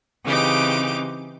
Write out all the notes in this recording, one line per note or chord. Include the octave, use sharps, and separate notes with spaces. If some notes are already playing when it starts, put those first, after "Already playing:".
C#3 E3 C4 D#4 G4 D6